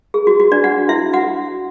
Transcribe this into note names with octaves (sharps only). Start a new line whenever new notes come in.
G#4
F#4
F#4
D4 D5
F#4 F#5
E4 E5
F#4 F#5